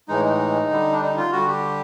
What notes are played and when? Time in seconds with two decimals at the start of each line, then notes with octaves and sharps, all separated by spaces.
0.08 A2 E3 G#3 D#4
0.25 D#4
0.70 D3 G3
0.92 D4
1.02 D#4
1.17 F4
1.32 D3 G3 F#4
1.48 G4